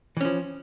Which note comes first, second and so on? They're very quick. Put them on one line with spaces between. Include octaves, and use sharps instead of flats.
E3 C#4 F3